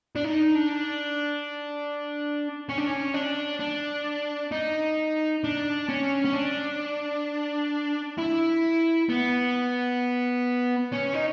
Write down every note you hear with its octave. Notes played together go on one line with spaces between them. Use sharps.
D4
D#4
D4
C#4
D4
C#4
D4
D4
D#4
D4
C#4
C#4
D4
E4
B3
C#4
D#4